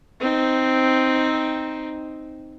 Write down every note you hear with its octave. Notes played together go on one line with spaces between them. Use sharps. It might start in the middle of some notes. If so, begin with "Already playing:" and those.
C4 D#4